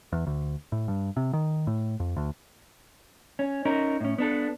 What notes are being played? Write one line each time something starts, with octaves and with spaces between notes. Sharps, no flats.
E2
D2
A2
G2
C3
D#3
A2
F2
D2
C#4
C#4 D#4 A#4
A2 C#4
B3 D4 A4